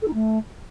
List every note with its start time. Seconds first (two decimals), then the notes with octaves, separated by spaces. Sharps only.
0.02 A4
0.08 D#4
0.14 A3